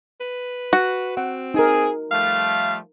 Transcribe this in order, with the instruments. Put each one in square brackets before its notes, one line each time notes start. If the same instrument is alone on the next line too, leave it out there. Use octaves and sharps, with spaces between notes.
[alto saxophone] B4
[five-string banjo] F#4
[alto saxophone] C4 [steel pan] F#5
[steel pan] D#4 A#4 [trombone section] G#4
[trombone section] F3 G3 A3 [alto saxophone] F5